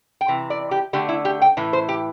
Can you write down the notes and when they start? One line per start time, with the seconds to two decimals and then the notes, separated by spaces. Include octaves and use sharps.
0.21 G5
0.28 C3 E3
0.50 D5
0.71 G4
0.93 D3 A3 G4
1.09 E4
1.25 G4
1.42 G5
1.57 A2 E3
1.73 C5
1.89 G4